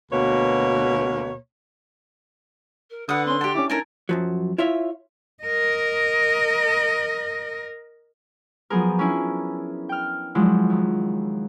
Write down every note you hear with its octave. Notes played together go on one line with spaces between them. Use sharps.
D2 B2 A#3 B4 C#5
A#4
D3 B4 F#5 D#6
C4 C#4 C6
G4 A4 D5 F#5
C#4 D4 E4 D6
D#4 A4 A#4 G#5
F#2 F3 F#3
E4 F4 C#5 E5
A#4 D#5
F3 F#3 B3 G#4 A#4
C#4 D4 E4 G#5
G5 F6
F3 F#3 G#3 D4 E4
D#2